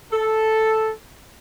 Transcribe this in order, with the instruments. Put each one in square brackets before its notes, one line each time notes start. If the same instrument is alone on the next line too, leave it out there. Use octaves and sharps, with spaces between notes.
[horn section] A4